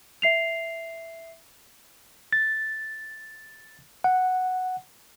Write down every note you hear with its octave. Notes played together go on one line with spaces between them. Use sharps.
E5 C7 F7
A6
F#5